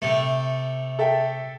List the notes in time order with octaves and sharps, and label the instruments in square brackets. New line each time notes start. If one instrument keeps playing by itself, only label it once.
[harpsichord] C3 A3
[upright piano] A4 E5 G5